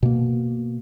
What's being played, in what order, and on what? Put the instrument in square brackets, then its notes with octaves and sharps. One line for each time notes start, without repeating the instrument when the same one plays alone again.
[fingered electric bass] B2 A#3